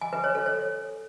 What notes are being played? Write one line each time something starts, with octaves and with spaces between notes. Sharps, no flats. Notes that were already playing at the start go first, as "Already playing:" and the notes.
G#5
B4
C#5
A4
C#5